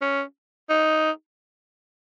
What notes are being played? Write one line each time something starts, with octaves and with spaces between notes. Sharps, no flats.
C#4
D#4